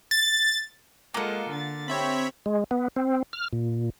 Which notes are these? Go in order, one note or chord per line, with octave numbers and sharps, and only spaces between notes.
A6
G#3 A#3 F4 A4 F#5
D3 A6
C4 G4 C#5 E5 B5
G#3
B3
C4
F6
A#2